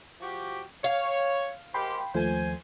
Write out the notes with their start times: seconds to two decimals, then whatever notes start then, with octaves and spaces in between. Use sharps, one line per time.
0.20 F3 F#4 G4
0.84 C#5 F5
1.74 G#2 D#3 G4 G5 B5 C6
2.15 D#2 F3 A3 C5 G#5